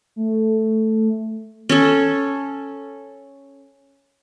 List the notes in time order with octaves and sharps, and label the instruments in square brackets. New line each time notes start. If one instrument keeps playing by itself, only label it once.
[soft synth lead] A3
[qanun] C#4 A4